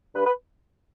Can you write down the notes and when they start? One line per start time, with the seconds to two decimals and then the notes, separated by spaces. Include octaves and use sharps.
0.15 G2 B4
0.25 B4